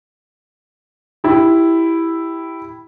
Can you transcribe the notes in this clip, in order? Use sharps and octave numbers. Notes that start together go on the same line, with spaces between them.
E4 G4